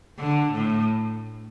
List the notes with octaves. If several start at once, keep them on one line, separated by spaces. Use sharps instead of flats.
D3
A2